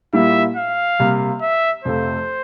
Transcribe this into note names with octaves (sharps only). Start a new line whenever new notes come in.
A#2 G3 A#3 E4 E5
F5
C3 G3 A#3
E5
F2 C3 F3 A3 C5